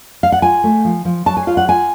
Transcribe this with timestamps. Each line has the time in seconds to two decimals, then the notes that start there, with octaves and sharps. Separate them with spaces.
0.23 F5
0.32 F#5
0.42 F4 G#5
0.64 A3
0.85 F3
1.05 F3
1.26 F#3 A5
1.37 G#5
1.47 F4 F5
1.57 F#5
1.68 F4 G#5